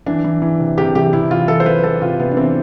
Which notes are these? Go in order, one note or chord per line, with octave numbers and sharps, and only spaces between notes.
E3 D4
E3
E3
C3
C3 G4
E3 G4
C3 E4
E3 F4
E3 A4
C5
E3 B4
E3 A4
C3 F4
C3 B3
D4
E3 C4